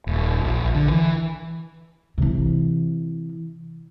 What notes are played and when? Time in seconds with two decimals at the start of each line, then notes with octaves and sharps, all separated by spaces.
0.07 D#1
0.44 A#1
0.75 D3
0.91 E3
2.18 C3 E3